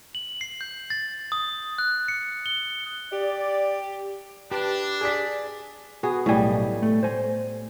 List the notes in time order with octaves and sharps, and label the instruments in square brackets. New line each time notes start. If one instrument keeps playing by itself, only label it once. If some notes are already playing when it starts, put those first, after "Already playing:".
[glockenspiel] F#7
C7
G6
A6
D#6
F#6
C#7
G7
[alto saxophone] G4 [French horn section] D5
[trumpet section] D4 [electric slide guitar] G4 [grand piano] B4
[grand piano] G#4 D5 B6
[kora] B3 G#4 [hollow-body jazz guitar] F#4
[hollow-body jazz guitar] B1 G#5 [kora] A2 G3
[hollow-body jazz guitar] A3
C5 G#5